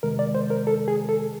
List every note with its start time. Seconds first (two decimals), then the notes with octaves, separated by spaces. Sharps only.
0.03 F2 C3 D#3 G#3 A#4
0.19 D5
0.35 C5
0.50 A#4
0.67 A4
0.88 G#4
1.09 A4